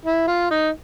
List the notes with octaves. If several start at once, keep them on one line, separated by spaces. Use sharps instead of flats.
E4
F4
D#4